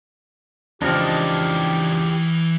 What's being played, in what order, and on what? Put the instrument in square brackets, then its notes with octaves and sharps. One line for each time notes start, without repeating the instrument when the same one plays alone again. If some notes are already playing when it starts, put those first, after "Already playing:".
[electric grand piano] C#2 F3 F6 [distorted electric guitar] E3 D5 [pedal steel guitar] D4 D#5 [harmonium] G4